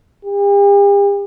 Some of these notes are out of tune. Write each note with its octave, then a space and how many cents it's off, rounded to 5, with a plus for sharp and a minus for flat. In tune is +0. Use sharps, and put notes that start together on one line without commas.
G4 +45